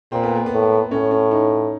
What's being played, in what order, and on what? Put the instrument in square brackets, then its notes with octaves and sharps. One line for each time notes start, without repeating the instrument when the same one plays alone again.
[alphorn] A#2 [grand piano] C4
[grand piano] B3
A#3
B3
[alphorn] A2
[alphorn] A2 [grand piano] C#4
[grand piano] C#4
D#4